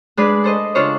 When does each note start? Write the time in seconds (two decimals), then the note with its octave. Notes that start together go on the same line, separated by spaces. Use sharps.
0.17 G#3 D4 G#4 B4 D5
0.44 A4 C5 D#5
0.75 C#3 D4 F4 C5 C#5